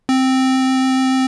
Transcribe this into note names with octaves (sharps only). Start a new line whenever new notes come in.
C4